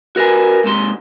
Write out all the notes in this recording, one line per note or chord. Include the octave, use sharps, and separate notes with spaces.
F#4 A#4 B4 G#5
G#2 C3 C6